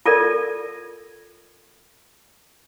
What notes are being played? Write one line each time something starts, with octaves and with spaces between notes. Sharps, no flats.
F4 A4 A#4 D5